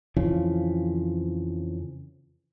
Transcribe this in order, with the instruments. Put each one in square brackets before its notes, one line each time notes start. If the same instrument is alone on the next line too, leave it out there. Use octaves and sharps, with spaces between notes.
[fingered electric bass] F2 C#3 E3 F3